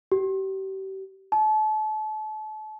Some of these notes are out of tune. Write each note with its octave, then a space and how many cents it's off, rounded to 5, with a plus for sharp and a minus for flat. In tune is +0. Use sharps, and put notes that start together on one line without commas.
G4 -35
A5 -35